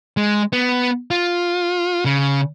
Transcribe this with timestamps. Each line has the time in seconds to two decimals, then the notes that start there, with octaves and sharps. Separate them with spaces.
0.17 G#3
0.53 B3
1.11 F4
2.05 C#3